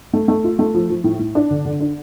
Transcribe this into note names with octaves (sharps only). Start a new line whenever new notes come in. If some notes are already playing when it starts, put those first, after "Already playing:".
A3
A3
F4
A3
F3
F3
A2
A2
D4
D3
D3
D4